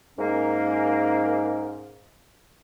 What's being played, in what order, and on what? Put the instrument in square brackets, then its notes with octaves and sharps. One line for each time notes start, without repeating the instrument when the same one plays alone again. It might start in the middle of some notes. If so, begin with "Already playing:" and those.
[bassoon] G#2 [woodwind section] A#3 C#4 A#4